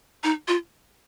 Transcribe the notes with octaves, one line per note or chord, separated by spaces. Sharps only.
D#4
F4